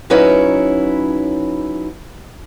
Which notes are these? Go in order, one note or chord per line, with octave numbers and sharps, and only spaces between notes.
F#3 C#4 D#4 E4 B4 C#5